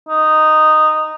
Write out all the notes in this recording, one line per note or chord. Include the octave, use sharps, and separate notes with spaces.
D#4